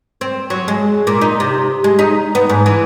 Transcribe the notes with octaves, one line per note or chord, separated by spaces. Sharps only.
C4
F#3
G#3
A#2
D#4
C3
G#3
D#4
B3
G#2
E3